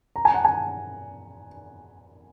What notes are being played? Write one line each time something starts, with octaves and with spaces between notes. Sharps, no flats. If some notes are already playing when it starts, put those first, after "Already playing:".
A#5
G#5
F#5
G#5